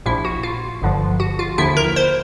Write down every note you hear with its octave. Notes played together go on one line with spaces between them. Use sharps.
A#1 A#2 F3 E4
F#4
F4
G1 G2 D3 F3
F#4
F4
D#2 D3 F3 E4
A#4
C5